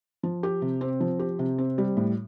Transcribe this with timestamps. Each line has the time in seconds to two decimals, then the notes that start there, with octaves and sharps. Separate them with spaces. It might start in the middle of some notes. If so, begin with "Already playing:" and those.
0.23 F3
0.43 G4
0.62 C3
0.81 C4
1.00 F3
1.19 G4
1.39 C3
1.58 C4
1.78 G3
1.97 A2